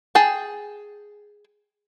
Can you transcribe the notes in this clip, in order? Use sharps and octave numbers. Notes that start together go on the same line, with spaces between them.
G#4 G5 A5